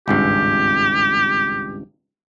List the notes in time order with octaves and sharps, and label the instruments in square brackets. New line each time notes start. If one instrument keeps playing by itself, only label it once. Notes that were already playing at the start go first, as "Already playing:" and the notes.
[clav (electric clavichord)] G#1 C#2 G2 [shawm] G4